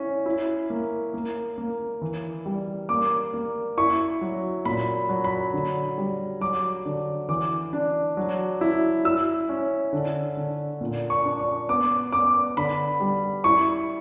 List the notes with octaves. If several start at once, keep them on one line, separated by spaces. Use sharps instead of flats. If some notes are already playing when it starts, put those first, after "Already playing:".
Already playing: C#4 E4
E4
A#3
A#3
A#3
E3
G3
A#3 D6
A#3
E4 C#6
F#3
A#2 B5
F#3
B5
D3
G3
F#3 D6
D3
E3 D6
D4
F#3
E4
E4 E6
C#4
D3
D3
A#2
C#6
D4
C#6
B3 D6
B3 D6
D3 B5
G3
E4 C#6